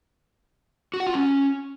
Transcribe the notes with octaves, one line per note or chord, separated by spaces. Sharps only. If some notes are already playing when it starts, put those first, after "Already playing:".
F#4
F#5
F4
C#4